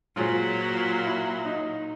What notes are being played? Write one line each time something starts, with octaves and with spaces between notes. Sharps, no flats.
A#2 F#3 F4 G#4 C5
E4
D#4